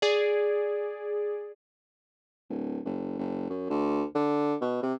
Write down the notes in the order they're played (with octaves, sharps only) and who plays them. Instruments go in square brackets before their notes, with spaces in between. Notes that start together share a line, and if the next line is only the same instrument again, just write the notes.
[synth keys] G#4 D5
[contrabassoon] D1
F#1
F#1
F#2
D2
D3
B2
C3